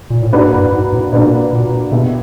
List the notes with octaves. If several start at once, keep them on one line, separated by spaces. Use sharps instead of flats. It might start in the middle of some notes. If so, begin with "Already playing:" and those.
A#2
A2
G#2 A#3 D4 F#4 B4 D5
G2
G#2
A2
A#2 A#3 D4 F#4 B4 D5
A#2
B2 B3 E4 G4